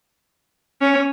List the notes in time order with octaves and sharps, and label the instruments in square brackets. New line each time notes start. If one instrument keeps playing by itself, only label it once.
[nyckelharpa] C#4